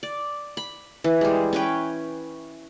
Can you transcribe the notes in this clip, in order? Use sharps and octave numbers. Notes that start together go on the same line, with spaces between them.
D5
B5
E3
G3 G#3
C#4 B4 G5